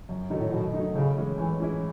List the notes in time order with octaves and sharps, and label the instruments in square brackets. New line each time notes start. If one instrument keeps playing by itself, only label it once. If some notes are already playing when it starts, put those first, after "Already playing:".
[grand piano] F#2
D#3 F#3 A3 D#4
[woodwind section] A2
[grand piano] F#2 [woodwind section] B2
[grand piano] D#3 F#3 A3 D#4
[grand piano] A2 [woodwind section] C#3
[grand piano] E3 G#3 C#4 E4
[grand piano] A2 [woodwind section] E3
[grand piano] E3 G#3 C#4 E4